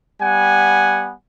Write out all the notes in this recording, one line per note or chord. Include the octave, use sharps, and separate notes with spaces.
G3 B3 F#5 G#5